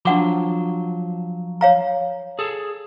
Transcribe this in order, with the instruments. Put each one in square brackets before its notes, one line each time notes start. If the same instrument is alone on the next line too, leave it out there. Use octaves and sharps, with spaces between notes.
[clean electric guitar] F3 F#3 C6 [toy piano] D4 F#5 D6
[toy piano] C#5 F5 A#5
[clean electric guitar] G#4 A4